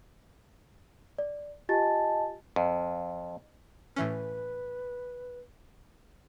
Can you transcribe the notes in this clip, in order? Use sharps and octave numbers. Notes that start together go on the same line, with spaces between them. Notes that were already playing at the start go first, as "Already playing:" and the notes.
D5
F4 G4 D#5 G#5 A5 A6
F2
A2 E3 C#4 B4